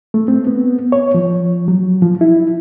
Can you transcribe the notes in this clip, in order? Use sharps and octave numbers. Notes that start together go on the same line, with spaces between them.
A3
C4
B3
C#5
F3
F#3
F3
E4